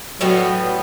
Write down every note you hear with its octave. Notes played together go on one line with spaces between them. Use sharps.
A2 E3 F#3 G3 B3